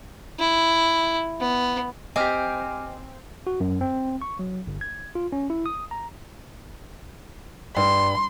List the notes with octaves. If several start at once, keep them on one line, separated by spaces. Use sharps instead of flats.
E4
B3
C4 G4 D#5 G#5 D6 F6
F#4
F#2
C4
C#6
F#3
G1
G#6
F4
C#4
E4
D#6
A#5
G2 C6